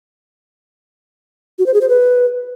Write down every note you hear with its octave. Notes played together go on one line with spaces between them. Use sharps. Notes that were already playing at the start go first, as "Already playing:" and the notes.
F#4
C5
G#4
C5
B4